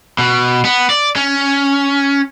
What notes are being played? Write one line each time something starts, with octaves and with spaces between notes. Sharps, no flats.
B2
B3
D5
C#4